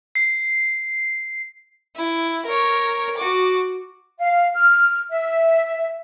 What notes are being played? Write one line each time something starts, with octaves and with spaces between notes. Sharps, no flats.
C7
E4
A#4 C#5
F#4 D6
F5
F6
E5